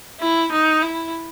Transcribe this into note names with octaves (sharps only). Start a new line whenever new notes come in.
E4
D#4
E4